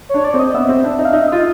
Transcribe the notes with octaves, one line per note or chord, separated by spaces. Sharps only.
D4 C#5
D5
C4
D#5
B3 E5
C4
D4
D#4
F5
D#4 E5
F4 D#5